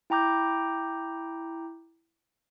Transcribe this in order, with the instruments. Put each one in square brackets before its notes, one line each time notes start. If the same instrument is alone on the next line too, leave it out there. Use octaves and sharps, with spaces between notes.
[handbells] E4 G5 A#5 D6 G6